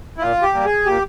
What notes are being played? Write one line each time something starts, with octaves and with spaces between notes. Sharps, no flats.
E4
A#2 F4
G4
G3 A#3
G#4
A#2 G4